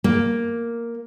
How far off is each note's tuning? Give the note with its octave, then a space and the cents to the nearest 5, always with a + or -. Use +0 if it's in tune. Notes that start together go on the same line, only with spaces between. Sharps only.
A#3 +0